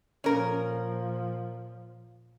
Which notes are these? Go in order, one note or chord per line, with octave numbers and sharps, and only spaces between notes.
A#2 F3 C#4 A#4